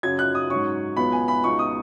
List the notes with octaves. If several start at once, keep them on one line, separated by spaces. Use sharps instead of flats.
F#2 C#3 F#3 G#6
F#6
D#6
G#2 F#3 C#4 C#6
C#2 B2 F#3 B3 B5
G#5
B5
C#2 B2 B3 D#4 C#6
D#6